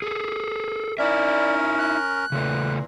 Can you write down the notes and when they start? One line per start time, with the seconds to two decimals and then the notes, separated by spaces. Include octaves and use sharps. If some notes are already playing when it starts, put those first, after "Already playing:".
0.02 G#4 A4
0.98 C#4 D#4 E4 A#4 D5 E5
1.78 F#6
2.32 A#2 C#3 E3 A3